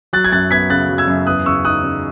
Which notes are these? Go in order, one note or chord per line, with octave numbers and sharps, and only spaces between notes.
F#3 F#6 A6
G#6
F#2 F#6 A6
B3 G#6 B6
C#3 F#6 A6
F#3
E6 G#6
F#2
E2 D#6 F#6
C#3 C#6 E6
D#4 D#6 F#6
C#3